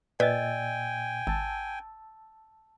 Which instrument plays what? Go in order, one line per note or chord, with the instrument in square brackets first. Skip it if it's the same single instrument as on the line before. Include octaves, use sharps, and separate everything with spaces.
[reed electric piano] A#2 E6 A6 [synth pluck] B4 [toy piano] D5 D#5 [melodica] G5 G#5
[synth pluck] G#1 [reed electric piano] A5 E6